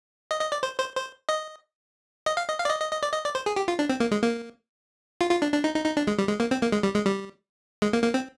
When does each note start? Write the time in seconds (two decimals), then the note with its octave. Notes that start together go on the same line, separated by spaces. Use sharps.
0.31 D#5
0.41 D#5
0.52 D5
0.63 C5
0.79 C5
0.96 C5
1.29 D#5
2.26 D#5
2.37 F5
2.48 D#5
2.59 F5
2.65 D5
2.70 D#5
2.80 D#5
2.91 D#5
3.03 D5
3.13 D#5
3.24 D5
3.35 C5
3.46 G#4
3.56 G4
3.68 F4
3.79 D4
3.89 C4
4.00 A#3
4.11 G#3
4.22 A#3
5.21 F4
5.31 F4
5.42 D4
5.53 D4
5.64 D#4
5.75 D#4
5.85 D#4
5.97 D4
6.07 G#3
6.18 G3
6.29 G#3
6.40 A#3
6.51 C4
6.62 A#3
6.72 G#3
6.83 G3
6.95 G#3
7.06 G3
7.82 G#3
7.93 A#3
8.03 A#3
8.14 C4